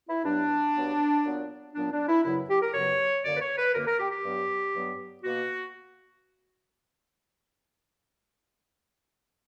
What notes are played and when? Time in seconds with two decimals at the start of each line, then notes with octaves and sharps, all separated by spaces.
0.08 E4
0.24 G2 F#3 B3 D4
0.75 G2 F#3 B3
1.24 A#2 F#3 B3
1.74 A#2 F#3 B3 D4
1.91 D4
2.08 E4
2.24 F#2 C#3 F#3 B3 E4
2.50 G4
2.62 A#4
2.74 F#2 C#3 F#3 B3 C#5
3.24 F#2 D3 A#3 D5
3.36 B4
3.41 C#5
3.57 B4
3.74 F#2 D3 A#3 A#4
3.87 A#4
4.00 G4
4.11 G4
4.24 G2 F#3 B3
4.74 G2 F#3 B3
5.24 B2 A#3 F#4